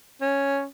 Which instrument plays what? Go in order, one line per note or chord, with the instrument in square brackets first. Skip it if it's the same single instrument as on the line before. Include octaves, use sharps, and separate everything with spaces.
[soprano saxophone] C#4